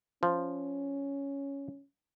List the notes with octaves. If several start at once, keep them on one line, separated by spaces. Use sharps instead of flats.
F3 C#4